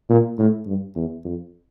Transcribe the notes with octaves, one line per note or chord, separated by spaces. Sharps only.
A#2
A2
G2
E2
F2